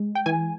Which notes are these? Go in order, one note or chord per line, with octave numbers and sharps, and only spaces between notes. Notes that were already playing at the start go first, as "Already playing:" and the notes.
Already playing: G#3
G5
E3 G#5